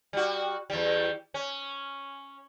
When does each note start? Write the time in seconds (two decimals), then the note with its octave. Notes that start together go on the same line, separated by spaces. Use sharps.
0.13 G3 F#4
0.70 E2 G3
1.34 C#4